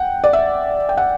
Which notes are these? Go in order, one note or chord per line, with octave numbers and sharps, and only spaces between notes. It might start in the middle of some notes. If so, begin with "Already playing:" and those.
Already playing: F#5 G5
D5
E5
G5
F#5